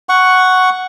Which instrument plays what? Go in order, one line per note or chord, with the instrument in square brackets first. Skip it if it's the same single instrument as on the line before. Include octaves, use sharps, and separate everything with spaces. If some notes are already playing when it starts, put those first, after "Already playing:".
[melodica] F#5 C#6